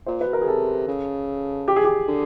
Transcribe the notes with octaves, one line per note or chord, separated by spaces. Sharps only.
A#2 C5
B4
B2
A#4
G#4
C3 A4
C#3
G4
G#4
G4
D3